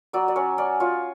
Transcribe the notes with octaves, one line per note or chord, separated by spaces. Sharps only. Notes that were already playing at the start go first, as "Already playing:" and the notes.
F#3 D5
D5
C#4 C#5
C#4 D5
F4 C#5